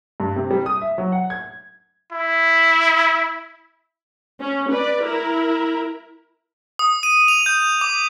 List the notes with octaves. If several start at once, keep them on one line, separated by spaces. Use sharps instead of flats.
G2
C3
G3
D#6
E5
F#3
F#5
G#6
E4
C#4
B4 D5
E4 A#4
D#6
D#7
F7
G6
D6